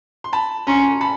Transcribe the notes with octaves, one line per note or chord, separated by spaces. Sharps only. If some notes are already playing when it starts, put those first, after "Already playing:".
C6
A5 B5
C#4 A#5 C6
A5 B5